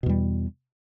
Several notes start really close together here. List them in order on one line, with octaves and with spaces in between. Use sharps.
B2 E2 G3